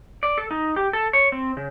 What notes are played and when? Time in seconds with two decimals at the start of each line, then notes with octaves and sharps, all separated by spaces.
0.23 D5
0.38 A4
0.51 D#4
0.76 G4
0.93 A4
1.13 C#5
1.32 C4
1.57 C#3